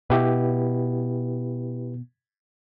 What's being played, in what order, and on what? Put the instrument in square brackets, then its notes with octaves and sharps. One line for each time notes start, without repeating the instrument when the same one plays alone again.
[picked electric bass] B2 [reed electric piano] E4 G4 B4